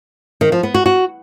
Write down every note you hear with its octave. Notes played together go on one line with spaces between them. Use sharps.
D#3
F3
B3
F#4
F#4